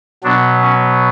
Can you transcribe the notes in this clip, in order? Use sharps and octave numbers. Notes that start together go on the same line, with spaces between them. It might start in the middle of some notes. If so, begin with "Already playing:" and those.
B2 F#3 B3 D4
C#4